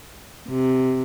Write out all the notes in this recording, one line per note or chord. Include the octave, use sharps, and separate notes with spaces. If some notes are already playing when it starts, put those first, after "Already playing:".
C3